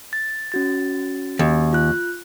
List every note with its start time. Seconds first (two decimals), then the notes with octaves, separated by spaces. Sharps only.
0.13 A6
0.52 C#4 F#4 A6
1.39 D#2
1.73 F4 F#6